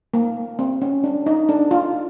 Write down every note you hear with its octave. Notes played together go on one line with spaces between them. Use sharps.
A#3
C4
C#4
D4
D#4
D4
F4